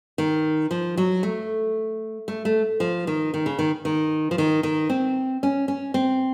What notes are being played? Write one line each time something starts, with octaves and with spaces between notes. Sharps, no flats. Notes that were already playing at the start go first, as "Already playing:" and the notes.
D#3
F3
F#3
A3
A3
A3
F3
D#3
D#3
C#3
D#3
D#3
F3
D#3
D#3
C4
C#4
C#4
C4